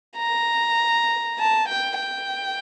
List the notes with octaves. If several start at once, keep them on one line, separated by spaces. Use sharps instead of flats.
A#5
A5
G5
G5